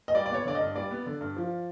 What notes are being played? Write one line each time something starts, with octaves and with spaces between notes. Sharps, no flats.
D#5
G3 D5
D5
B3 C#5
D3 D5
D#5
G2
G3 D5
B3
D3
G2
F3